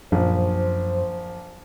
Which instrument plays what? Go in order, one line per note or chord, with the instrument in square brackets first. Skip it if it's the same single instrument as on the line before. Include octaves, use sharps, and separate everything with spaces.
[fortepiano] A#1 [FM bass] F#2 [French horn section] C5